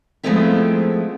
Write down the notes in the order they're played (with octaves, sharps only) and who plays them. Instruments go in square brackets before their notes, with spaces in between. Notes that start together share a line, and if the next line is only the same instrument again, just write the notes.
[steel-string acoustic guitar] F3 G#3 A3 B3 C4 E4